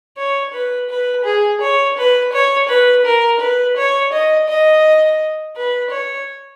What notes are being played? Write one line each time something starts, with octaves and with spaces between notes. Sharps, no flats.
C#5
B4
B4
G#4
C#5
B4
C#5
B4
A#4
B4
C#5
D#5
D#5
B4
C#5